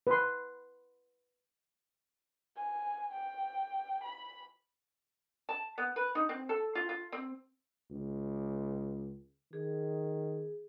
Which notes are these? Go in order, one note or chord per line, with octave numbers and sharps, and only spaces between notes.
B4 C6
G#5
G5
B5
A5
B3
B4
D#4
C4
A4
F4
F4
C4
C#2
D#3 G#4